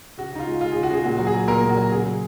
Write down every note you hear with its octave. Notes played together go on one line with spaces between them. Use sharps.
C#3 F#4
C#3 D#4
F4
G#3
G#3 F4
C#3 G#4
F#4
C#3 G#4
A#2 F#4
F#3 F#4
G#4
F#3
A#2 A#4
A#2
F#4
F#3
C#3 G#4
F#3